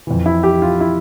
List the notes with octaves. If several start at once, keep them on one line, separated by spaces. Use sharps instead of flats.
F2 E3
E4
G4
F4
E4